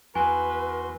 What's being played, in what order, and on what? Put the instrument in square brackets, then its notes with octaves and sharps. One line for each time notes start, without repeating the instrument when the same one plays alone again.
[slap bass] E2 [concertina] F#4 C6 [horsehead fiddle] B4 [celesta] G#5